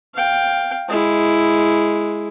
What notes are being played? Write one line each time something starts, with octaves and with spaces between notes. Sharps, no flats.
F5 G5
G#3 E4